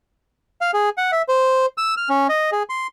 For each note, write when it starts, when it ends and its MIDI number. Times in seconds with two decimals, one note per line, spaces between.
0.61 0.71 77
0.74 0.89 68
0.98 1.11 78
1.12 1.22 76
1.29 1.66 72
1.78 1.95 88
1.97 2.09 89
2.09 2.27 61
2.29 2.50 75
2.52 2.63 68
2.69 2.87 84